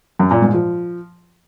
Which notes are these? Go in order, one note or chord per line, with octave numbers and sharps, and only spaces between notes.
F#2
A#2
G#2
F3